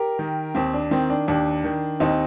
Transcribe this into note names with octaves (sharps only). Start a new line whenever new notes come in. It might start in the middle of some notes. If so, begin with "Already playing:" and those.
Already playing: G4 A#4
D#3
D#2 C4
D4
D#3 C4
D4
D#2 D4
D#3
D#2 C4 D#4